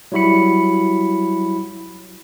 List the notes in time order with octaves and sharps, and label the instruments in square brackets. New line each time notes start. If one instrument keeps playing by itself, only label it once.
[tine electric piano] F#3 G3 E4 F#4 B5 C#7